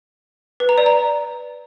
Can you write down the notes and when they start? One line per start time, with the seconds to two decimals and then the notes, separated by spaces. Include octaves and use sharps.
0.60 B4
0.69 A#5
0.78 D5
0.86 A#5